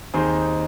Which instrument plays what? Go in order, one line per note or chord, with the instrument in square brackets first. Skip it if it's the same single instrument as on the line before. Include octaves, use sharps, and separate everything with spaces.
[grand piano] D#2 D#3 C4 D#4 G#4 C5